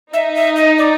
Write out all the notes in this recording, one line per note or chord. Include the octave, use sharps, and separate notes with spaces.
D#4 E5
E5
D#5
D5